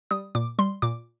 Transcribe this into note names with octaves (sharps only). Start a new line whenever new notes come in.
G3 D#6
A#2 D6
G3 C6
A#2 D6